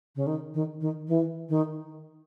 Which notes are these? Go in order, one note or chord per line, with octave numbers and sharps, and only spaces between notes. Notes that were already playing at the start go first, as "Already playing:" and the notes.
C#3
D#3
D#3
D#3
E3
D#3